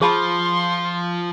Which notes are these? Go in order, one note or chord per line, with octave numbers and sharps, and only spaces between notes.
F3 G#4 A5 B5 C6